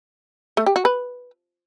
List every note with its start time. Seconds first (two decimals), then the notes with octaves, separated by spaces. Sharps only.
0.57 A3
0.66 G4
0.76 F#4
0.85 B4